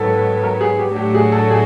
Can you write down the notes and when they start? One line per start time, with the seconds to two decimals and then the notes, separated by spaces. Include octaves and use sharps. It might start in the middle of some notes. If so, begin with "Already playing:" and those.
Already playing: G#2 D#3 F#3 B3 A4
0.43 A#4
0.61 G#4
0.78 G4
0.96 A2 F#3 A3 D4 F#4 G4
1.15 G#4
1.32 A4
1.50 G#4